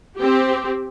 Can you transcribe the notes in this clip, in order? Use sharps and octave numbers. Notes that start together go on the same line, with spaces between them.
C4 G4